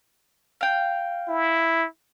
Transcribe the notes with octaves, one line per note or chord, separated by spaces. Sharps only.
F5 G5
E4